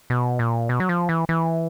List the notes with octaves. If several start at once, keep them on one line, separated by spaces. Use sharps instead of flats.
B2
A#2
B2
F#3
F3
E3
E3